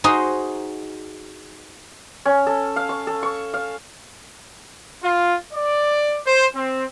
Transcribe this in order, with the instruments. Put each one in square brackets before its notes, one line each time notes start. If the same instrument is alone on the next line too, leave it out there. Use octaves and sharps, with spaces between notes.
[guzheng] D#4 F#4 G#4 C5 D#5
[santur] C#4
A4
F5
C#6
A4
C#6
F5
[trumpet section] F4
D5
C5
C4